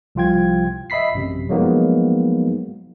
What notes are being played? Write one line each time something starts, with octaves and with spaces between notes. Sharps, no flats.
C2 F3 F4 G5 G#6
D#5 E5 B5 B6 C7
A1 F#2 C3
F3 F#3 G#3 A#3 B3 D#4